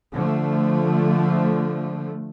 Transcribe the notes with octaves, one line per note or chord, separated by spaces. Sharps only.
D3 F3 A3